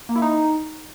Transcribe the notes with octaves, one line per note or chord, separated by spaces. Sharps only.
A#3
E4
D#4